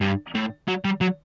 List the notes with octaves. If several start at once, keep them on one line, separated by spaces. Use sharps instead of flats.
G2
A2
F#3
G3
F#3